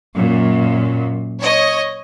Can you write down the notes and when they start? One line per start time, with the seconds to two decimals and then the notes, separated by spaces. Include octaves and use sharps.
0.16 F#2 A#2
1.41 C#5 D#5